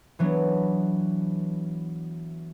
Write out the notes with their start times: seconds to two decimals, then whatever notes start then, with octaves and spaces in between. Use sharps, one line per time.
0.19 E3 F#3 B3 D4